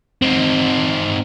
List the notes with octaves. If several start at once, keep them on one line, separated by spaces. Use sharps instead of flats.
C4 D#4